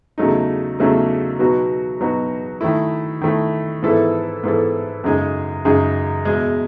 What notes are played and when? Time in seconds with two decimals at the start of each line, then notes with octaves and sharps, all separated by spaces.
0.18 E2 C#3 F#3 A3 D#4
0.79 E2 C#3 F#3 A3 D#4
1.39 B2 F#3 B3 D#4 F#4
2.00 B2 F#3 B3 D#4 F#4
2.61 D#3 A3 E4
3.21 D#3 A3 E4
3.83 G#2 E3 B3 E4 A4
4.43 G#2 E3 B3 E4 A4
5.04 F#2 C#3 G#3 D#4 G#4
5.65 F#2 C#3 G#3 D#4 G#4
6.25 E2 B2 G#3